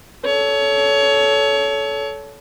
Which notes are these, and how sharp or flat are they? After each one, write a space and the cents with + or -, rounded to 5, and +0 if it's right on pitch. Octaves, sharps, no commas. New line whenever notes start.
A4 -15 C#5 +25